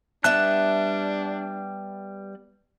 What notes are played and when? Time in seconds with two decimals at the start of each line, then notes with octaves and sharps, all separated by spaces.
0.24 G3 B3 D4 E5 F#5 A5 F#6